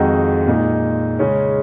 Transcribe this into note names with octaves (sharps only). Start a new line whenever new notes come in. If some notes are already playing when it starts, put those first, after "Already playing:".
Already playing: F2 D#3 G#3 D#4 F#4
A#2 G#3 D#4
C#3 G#3 C#4